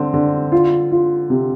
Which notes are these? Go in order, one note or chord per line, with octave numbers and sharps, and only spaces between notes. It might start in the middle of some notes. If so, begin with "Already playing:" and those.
Already playing: D3 C4
D3
F4
F4
C3